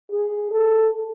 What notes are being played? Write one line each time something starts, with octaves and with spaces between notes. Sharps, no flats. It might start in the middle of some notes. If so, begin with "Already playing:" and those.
G#4
A4